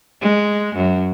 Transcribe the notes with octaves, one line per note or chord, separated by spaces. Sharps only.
G#3
F#2